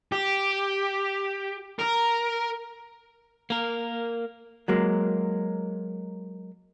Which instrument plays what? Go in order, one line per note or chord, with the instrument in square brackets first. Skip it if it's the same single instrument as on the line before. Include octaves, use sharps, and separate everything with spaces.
[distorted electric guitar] G4
A#4
[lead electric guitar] A#3 A#4
[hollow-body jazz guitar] F#3 G#3 A#3